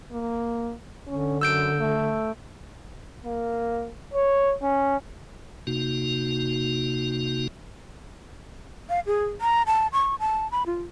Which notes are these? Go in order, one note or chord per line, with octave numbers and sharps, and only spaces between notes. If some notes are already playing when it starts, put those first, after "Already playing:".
A#3
D3 C#4
F#2 E6 G6 D7
A3
A#3
C#5
C#4
C3 A#3 D#4 F#4
F5
G#4
A#5
A5
C#6
A5
B5
F4